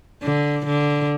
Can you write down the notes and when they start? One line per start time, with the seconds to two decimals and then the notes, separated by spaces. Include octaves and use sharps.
0.23 D3
0.67 D3